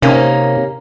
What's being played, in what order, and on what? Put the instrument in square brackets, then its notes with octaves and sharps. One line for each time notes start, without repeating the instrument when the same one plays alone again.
[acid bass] C3 [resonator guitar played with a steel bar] A#3 C#4 D#4